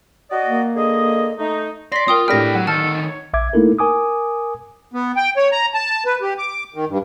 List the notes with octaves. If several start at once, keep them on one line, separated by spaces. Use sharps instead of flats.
F#4 D5 D#5
A#3
D3 G#4 D#5
A3 D#4
D5 C6 A#6 B6
F4 A#4 G5 D#6
A2 G#3 D4 G4 B4 G5 F6 A#6
F#3 F#5
D2 D#3 A4 A5 F6
C#5
A#1 E5 D6 G#6
A3 A#3 D#4 E4 A4 A#4
A#4 G#5 D6 D#6
B3
G5
C#5
A#5
A5
B4
G4
D6
D#3
G2